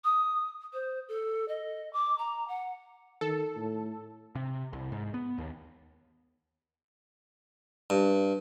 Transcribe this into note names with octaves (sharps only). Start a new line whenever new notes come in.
D#6
C5
A4
D#5
D6
A#5
F#5
D#3 A4
A2
C3
C2
G#2
B3
D#2
G2